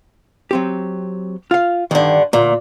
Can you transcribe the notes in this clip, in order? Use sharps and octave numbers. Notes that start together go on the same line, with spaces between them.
F#3 C4 G4
F4 F5
G2 D3 D#3
D2 A#2 A#3